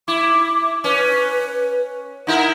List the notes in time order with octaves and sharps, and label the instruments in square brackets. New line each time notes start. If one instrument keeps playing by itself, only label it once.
[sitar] E4 [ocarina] D6
[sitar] C#4 [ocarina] B4
[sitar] D#4 E4 A#4 [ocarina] F#5